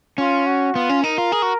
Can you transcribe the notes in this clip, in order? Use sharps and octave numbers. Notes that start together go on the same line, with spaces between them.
C#4 F4
F#4
B3 F4
C#4
D#4 A#4
F4
G#4
F#4